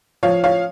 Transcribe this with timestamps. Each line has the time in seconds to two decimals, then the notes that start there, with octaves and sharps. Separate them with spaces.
0.23 F3 C#5 F5
0.44 C#5 F5